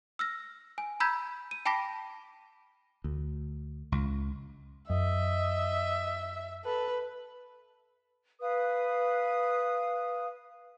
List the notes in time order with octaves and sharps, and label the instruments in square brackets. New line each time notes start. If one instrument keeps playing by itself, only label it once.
[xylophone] E6 F6 A#6
G#5
A#5 B5 E6 G6 G#6 B6
D#7
G5 A5 B5 D6 A#6 B6
[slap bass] D2
C#2
[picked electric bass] F#2 [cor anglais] D#5 [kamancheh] E5
[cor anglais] A4 [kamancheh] B4
[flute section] B4 F5 D#6